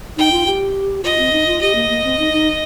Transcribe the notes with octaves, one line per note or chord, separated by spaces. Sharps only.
D#4 G5
F4
G4
F4 D#5
C4
D#4
F4
G4 D#5
A#3
A#3
C4
D#4
D#4